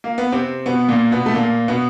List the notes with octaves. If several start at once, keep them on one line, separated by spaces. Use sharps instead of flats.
A#3
B3
C3 C4
B2 B3
A#2 A#3
B2 B3
A3
A#2 A#3
B2 B3